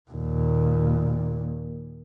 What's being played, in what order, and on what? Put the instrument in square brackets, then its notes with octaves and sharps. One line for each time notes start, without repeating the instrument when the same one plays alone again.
[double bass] D#2 A#2